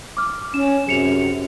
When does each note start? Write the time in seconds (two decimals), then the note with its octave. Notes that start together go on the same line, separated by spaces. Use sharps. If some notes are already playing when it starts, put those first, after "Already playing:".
0.17 D6 F6
0.54 C#4 E7
0.87 F#2 C3 G#4 C#7 F7